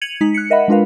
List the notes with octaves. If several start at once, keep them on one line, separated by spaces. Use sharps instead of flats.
G#6 C#7 D#7 F7 F#7
G#3 D#4 B6
F#6 C#7
A#4 D#5 E5 F#5 B5
G#3 D4 F4 A#4 B4 F5